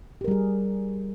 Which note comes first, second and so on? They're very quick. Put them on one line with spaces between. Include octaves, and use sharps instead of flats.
G4 A#4 G3 G#4